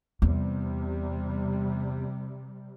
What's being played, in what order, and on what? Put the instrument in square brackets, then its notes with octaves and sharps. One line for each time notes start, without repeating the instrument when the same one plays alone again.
[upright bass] E2 [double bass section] C3 G3